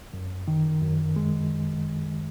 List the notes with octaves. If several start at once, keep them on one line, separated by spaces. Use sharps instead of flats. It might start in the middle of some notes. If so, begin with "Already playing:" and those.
F#2
D#3
F#2
G#3